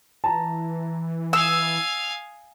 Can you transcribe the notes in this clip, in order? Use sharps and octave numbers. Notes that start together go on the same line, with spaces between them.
E3 A5 A#5
F5 G#5 D#6 E6